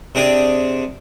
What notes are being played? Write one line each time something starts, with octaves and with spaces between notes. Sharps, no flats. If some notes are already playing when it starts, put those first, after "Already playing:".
C3 C4 D4 G#4